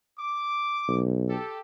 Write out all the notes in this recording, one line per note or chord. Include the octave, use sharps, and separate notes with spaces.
D6
B1
G4 A4